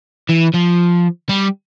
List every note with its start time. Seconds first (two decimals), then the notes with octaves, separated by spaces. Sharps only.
0.29 E3
0.54 F3
1.29 G3